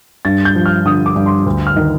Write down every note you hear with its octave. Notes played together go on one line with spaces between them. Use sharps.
G2 A6
G6
F3
F6
D3 D#6
D6
G2
C6
D2
F6
D#3